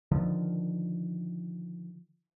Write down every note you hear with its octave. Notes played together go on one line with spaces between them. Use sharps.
D3 D#3 F3